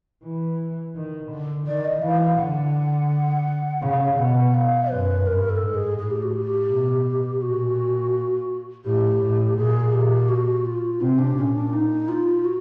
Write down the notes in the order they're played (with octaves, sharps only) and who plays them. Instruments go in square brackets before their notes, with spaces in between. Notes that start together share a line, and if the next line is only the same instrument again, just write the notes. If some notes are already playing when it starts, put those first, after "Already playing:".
[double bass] E3
D#3
D3
[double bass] D#3 [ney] D5
[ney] D#5
[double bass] E3 [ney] F5
[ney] F5
[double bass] D3 [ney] F#5
[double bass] C#3 [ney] F5
[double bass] B2 [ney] F#5
[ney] F5
[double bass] F#2 [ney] B4
[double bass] G2 [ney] A#4
[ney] A4
[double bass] G#2
[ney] G#4
[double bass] A2 [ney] G#4
[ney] G4
F#4
G4
[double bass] B2
[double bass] A#2 [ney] F#4
[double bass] A2 [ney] G4
[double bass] A2
[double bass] A#2 [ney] G#4
[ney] G4
F#4
F4
[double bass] C3 [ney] C4
[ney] D4
[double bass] A#2 [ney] C#4
[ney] D4
D#4
F4
F#4